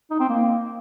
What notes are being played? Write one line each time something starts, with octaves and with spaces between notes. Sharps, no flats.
D#4
C4
A#3